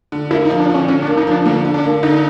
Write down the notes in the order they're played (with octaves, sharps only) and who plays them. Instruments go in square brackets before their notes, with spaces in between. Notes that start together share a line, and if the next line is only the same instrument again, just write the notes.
[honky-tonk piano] D3
[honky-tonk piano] A#3 [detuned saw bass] E4
[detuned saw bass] D#4
[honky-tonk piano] F3
[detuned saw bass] D4
[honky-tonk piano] D3 [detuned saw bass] C#4
[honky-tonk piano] D3 [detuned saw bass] C#4
[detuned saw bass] D4
[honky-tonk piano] A#3
[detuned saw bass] D#4
[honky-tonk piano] F3 [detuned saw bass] D4
[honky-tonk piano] D3 [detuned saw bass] A#3
[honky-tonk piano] D3
[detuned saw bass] D4
[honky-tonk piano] A#3
[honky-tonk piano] D3 [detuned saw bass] D#4